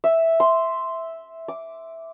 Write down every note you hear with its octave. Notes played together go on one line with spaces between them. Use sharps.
E5
C6
D6